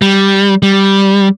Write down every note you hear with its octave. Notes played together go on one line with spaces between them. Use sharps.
G3
G3